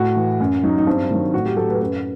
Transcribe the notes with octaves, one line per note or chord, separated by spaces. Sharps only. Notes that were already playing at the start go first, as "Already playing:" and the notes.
Already playing: A2 F#4
E3
F#2
F#3 D#4
D#4
G2 C4
D#3 F#3
A2 F#4
G4
F#3 A4
B4
A4
F#2 B4